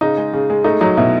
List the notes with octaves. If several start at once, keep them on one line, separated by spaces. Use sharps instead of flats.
C#3 D#4
G#3
C#3
G#3
A3 D#4
F#3 D#4
B2 E4